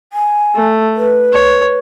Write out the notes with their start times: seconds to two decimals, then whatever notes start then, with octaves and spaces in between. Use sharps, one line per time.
0.13 G#5
0.56 A3
0.96 B4
1.33 C#5